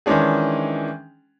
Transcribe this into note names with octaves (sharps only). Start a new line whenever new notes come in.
D#3 E3 G#3 C#4 D4 G#4